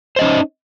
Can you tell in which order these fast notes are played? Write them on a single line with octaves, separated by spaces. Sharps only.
C5 D#5 C#4 D#4